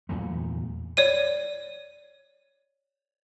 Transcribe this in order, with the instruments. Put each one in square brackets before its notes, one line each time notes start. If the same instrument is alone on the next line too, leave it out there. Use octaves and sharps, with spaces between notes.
[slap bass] E2 A#2 F#3 A3
[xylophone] C#5 D5 D#7